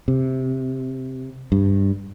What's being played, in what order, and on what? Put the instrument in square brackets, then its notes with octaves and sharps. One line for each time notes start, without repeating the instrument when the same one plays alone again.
[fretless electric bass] C3
G2